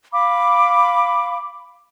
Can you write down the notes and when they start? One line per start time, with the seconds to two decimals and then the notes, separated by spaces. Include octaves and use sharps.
0.12 F5 B5 D6